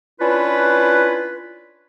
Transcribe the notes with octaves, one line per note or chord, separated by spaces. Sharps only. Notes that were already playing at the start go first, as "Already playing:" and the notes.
C#4 D4 E4 F4 B4